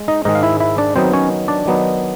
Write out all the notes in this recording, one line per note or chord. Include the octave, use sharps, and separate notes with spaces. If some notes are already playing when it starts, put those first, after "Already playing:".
Already playing: G#3
D#4 D#5
G#2 D#3 G#3 D#4 D#5
F5
E4 E5
E4 E5
D4 D5
D#3 F#3 B3 C4 D#4 C5
C#4 C#5
D4 D5
D#3 F#3 B3 D#4